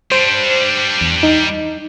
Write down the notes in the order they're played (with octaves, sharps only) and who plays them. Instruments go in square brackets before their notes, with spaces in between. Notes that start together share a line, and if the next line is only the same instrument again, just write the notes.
[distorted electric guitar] G3 D4 [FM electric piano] C5
[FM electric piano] E2
D#4